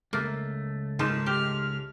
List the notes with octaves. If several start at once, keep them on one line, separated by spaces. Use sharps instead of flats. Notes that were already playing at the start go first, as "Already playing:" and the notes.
C#2 A3 A#3
G#2 A#3 D#4 F4 A5 E7
G4 F6